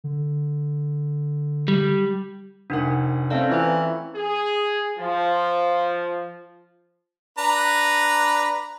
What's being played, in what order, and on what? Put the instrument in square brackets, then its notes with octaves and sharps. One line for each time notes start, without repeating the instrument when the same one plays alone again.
[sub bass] D3
[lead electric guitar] G3
[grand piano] F1 F#5 [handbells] D4 D#4 A#4
[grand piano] A3 C4 C#4 [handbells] D5 F5 A5
[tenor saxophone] E3 [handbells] F4 C5
[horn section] G#4
F3
[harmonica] D4 B4 A#5